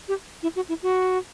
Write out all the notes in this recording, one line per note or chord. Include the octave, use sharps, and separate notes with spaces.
G4
E4
F#4
E4
F#4